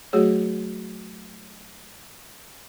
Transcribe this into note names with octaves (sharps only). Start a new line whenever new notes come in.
F#3 A3 F#4 G#4 C#5